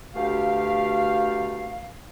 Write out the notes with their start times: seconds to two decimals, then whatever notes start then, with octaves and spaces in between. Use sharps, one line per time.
0.15 D2 B2 A3 G4 F5